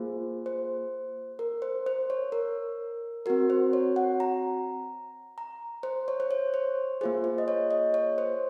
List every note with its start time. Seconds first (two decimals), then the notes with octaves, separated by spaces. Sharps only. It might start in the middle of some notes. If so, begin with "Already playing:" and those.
Already playing: A#3 F4 G#4 C5
0.46 C5
1.39 A#4
1.62 C5
1.86 C5
2.10 C#5
2.32 A#4
3.26 C4 F#4 A#4
3.50 C5
3.73 C#5
3.96 F#5
4.20 A#5
5.38 A#5
5.83 C5
6.08 C#5
6.20 C5
6.31 C#5
6.54 C5
7.01 A#3 F4 G#4 C5
7.24 C5
7.38 D#5
7.48 C#5
7.71 D#5
7.94 C#5
8.18 C5